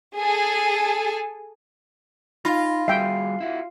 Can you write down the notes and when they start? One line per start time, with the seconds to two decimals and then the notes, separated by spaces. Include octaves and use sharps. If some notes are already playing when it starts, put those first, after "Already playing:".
0.17 G#4 A4 G#5
2.45 D#4 F4 B5 A#6
2.88 G3 F#4 G#4 E5 G5 C7
3.41 E4 F#4